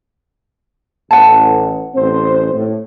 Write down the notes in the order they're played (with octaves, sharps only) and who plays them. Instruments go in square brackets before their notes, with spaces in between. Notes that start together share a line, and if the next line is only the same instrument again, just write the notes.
[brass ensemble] A1 [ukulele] F#5 A5
[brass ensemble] A1 C4 C5
A2